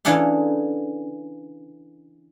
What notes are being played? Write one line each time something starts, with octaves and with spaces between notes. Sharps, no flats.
C#3 E3 D4 A4 F5